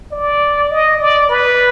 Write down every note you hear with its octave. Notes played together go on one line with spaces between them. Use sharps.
D5
D#5
D5
B4